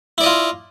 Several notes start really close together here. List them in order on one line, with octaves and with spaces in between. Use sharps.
E4 D5 D#5 F4